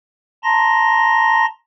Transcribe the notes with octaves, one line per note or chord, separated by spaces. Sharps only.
A5 A#5 C6 A#6